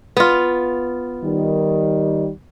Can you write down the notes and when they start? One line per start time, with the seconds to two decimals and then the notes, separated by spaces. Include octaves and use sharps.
0.17 B3 F4
1.23 D#3 G3